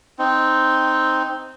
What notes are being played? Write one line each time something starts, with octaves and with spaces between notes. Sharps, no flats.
C4 D#4